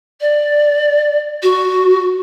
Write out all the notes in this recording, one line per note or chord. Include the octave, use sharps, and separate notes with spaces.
D5
F#4